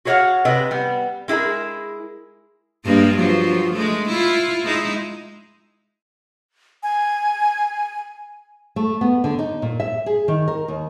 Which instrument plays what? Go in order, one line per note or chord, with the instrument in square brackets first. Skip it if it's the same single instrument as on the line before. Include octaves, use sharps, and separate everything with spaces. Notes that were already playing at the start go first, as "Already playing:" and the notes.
[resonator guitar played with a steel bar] F#4 G#4 C#5 D#5 F5 F#5
C3 B4 D5 D#5
G3 B3
G#3 E4 G4 G#4 A#4
[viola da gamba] G2 G#3 A#3
F3 F#3
G#3 A3
E4 F4
G#3 D#4 E4
[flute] G#5
[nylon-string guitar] A3
B3
D3
D#4
A#2
E5
G#4
D#3
A#4
D#2